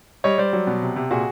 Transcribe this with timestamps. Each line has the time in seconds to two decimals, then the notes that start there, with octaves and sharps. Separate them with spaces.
0.24 G3 C#5 D#5
0.38 G3 C5 D5
0.53 F#3
0.67 B2
0.82 C3
0.96 C3
1.11 A#2 F#4 G#4